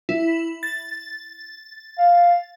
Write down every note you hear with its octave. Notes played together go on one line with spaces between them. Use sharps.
E4
A6
F5